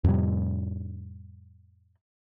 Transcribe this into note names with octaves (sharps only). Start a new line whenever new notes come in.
F2 A2 C3 G3